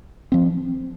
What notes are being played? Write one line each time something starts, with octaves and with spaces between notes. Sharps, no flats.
F3 C4